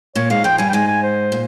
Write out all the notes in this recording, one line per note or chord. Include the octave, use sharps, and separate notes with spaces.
A#2 A#3 C#5
G#2 G#3 F5
F2 F3 G5
G2 G3 G#5
G5
G#2 G#3 G#5
G#5
C5
A#2